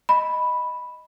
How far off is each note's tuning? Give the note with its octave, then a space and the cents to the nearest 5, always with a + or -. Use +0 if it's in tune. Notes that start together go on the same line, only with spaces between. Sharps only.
D#5 +0 B5 +0